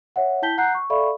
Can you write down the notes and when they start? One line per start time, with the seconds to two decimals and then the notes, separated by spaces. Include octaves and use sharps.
0.16 C#5 E5 F#5
0.42 E4 G5 A5 G6 B6 G7
0.58 F#5 A#5 F#6 G6 C7
0.75 C#6
0.90 A4 D5 E5 F5 B5 C#6